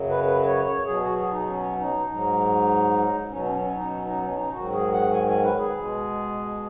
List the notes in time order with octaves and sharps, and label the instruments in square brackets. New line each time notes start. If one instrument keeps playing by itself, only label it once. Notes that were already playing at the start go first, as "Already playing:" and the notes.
Already playing: [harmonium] F#2 C#3 F#3
B4
B4
C#5
C#5
B2 F#3 G#4
F#4
G#4
D#4
C#4
D#4
G#2 F#3 D#4
B2 F#3 C#4
C#4
C#4
D#4
C#4
D#4
C#4
D#4
G#2 D#3 F#3 F#4
G#4
F#5
G#5
G#5
B4
G#4
B2 G#3